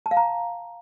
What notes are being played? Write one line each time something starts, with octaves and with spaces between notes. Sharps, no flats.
A5
F5
A#5